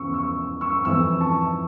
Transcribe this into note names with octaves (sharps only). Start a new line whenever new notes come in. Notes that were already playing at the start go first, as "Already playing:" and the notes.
Already playing: E2 C#3 F3 C#6 E6
C#6 E6
C#6 E6
F2 E3 C#6 E6
A5 C#6